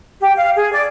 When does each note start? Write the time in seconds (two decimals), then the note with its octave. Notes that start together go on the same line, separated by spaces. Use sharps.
0.20 G4
0.36 F5
0.55 G#4
0.71 D5